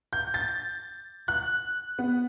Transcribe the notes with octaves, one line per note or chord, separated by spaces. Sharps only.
G6
A6
F#6
B3